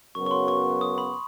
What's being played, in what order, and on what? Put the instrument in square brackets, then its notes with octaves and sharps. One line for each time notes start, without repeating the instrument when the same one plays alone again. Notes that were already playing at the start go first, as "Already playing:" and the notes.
[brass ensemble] F#2 C#3 F#3 B3 [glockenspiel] C#6
[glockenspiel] C#6
C6
C#6
D#6
B5